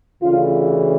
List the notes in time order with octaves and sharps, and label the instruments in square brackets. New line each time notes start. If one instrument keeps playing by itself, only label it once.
[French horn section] D2 C#3 E3 F4